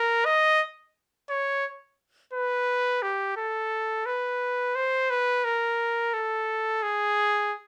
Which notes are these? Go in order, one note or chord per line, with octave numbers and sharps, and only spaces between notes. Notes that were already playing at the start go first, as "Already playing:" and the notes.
Already playing: A#4
D#5
C#5
B4
G4
A4
B4
C5
B4
A#4
A4
G#4